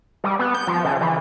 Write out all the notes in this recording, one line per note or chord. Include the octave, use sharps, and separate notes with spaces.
G3
B3
G6
F3
C#3
E3